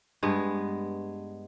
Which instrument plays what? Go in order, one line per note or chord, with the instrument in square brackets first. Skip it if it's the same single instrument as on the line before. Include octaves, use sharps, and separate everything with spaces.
[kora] G2 G#3 B3